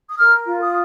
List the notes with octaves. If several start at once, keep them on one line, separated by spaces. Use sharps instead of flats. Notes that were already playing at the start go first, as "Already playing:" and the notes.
D#6
A#4 F6
F4
D#6